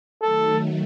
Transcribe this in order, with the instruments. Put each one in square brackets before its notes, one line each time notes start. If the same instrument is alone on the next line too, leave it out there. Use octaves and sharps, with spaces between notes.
[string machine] D#3 F#3 A3 [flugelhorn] A4